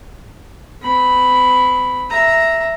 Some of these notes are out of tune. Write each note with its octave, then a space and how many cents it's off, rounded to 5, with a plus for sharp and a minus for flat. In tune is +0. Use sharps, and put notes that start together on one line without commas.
C4 -45 B5 +0
E5 +0 A#5 +0